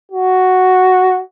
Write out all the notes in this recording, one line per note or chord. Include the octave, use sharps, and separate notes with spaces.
F#4